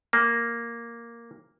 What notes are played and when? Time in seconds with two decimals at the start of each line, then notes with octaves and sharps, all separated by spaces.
0.13 A#3